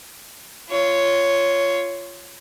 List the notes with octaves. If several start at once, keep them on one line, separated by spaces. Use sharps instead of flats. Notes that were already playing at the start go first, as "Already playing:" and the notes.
F4 C#5